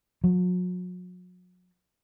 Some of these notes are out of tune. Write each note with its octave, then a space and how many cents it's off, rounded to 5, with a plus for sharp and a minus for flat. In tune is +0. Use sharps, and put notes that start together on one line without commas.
F#3 -40